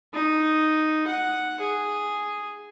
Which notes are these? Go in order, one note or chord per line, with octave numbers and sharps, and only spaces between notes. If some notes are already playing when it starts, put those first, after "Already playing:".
D#4
F#5
G#4